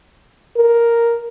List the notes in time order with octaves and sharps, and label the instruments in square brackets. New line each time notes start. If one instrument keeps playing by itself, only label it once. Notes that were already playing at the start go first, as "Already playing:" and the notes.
[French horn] A#4